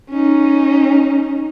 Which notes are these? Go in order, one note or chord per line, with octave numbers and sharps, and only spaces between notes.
C#4 D#4